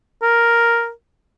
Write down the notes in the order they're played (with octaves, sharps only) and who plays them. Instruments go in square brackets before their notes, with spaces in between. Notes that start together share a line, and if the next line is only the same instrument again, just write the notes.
[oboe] A#4